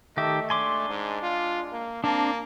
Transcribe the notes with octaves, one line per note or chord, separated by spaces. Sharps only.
D#3 A3 G4 A4 D#5 E5
G#3 D4 D5 G#5 C6 D6
G#2
F4
A#3
A#3 C4 D4 A5